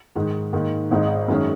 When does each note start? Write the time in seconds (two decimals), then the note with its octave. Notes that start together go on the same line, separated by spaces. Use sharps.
0.15 G#2 D#3 G#3
0.53 G#2 D#3 A#3
0.91 G#1 G#2 G#3 D#4
1.28 F#2 D#3 G#3 C#4